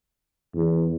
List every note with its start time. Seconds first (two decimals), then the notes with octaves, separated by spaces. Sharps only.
0.55 E2